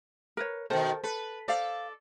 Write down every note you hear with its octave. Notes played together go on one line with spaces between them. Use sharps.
A#4 B4 C#5
B2 D#3 A4 A#4 C5
A4 B4
A4 C5 D5 F5